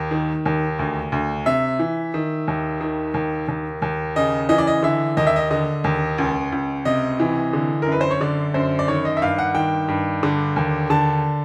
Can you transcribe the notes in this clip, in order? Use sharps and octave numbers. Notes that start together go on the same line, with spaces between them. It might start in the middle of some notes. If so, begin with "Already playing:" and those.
Already playing: D#2
D#3
D#2
D2
D2
C3 E5
E3
D#3
D#2
D#3
D#2
D#2
D#2
C#3 D#5
E3 D#5
D5
D#5
D3 E5
D#2 D#5
E5
D#5
D3 D#5
D#2
C#2
C#2
C3 D#5
E3
D3
F#2 A#4
B4
C5
C#5
D3 D5
F#2 C5
D5
D#3 C#5
D#5
E5
G2 F5
F#5
D#3 G5
G2
D3
D#2
D3 A5